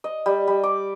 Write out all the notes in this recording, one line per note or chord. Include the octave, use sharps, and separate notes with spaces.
D#5
G3
G3
D6